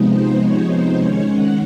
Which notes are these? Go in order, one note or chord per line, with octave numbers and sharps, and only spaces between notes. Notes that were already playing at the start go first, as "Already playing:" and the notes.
Already playing: C3 F3 G#3 B3 D#4
C5
C#5
C5
D#3 G#3 C#4 C#5
F#5